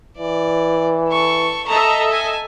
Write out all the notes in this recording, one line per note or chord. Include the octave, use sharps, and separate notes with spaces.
E3 D5
A4 C#6
A4 D#5 E5 A5 A#5
G#5 A5